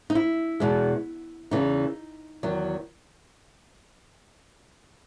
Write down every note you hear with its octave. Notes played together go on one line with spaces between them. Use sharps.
D#4
E4
E2 B2 G#3
E2 C#3 E3 D#4
E2 D#3 F#3